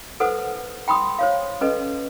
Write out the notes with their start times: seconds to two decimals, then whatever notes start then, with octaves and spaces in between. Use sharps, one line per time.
0.20 A4 B4 C5 F#5 D#6
0.88 G5 B5 C6 D#6
1.19 C5 C#5 F5
1.61 C#4 A4 B4 D#5